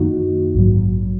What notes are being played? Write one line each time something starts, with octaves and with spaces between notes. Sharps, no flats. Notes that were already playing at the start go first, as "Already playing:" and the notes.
Already playing: F#2 D#3 A#3 D#4 F#4
A#1 G#2 F#3